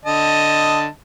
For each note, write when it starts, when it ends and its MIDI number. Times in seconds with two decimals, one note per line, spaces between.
0.06 0.87 50
0.06 0.87 75
0.06 0.87 81